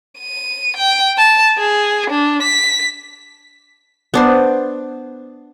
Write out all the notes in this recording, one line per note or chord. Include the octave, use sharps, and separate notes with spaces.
D#7
G5
A5
G#4
D4
B6
B3 D4 C5